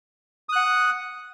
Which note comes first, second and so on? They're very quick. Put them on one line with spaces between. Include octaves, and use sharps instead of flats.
D#6 F#6 F#5